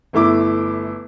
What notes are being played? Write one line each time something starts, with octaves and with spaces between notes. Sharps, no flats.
G1 A3 E4 D6